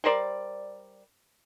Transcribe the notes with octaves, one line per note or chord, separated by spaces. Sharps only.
G3 A#4 C5 D5